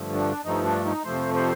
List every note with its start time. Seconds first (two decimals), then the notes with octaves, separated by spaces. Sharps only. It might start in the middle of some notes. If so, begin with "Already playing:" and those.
Already playing: G2 D3 F3 A3
0.15 D4
0.44 G2 F3 A3 D#4
0.65 D4
0.85 D#4
1.04 F2 C3 F3 A3 C5
1.34 C5